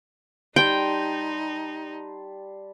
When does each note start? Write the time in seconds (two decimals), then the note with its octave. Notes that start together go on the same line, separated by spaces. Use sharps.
0.56 G3 D#4 G5 A5 C6